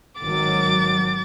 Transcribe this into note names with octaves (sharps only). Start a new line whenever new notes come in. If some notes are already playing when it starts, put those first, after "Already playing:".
G#1 D#3 F#3 D6 A6